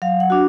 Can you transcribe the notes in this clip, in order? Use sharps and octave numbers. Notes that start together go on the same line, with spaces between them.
F#3 F5
F#5
D4 F#4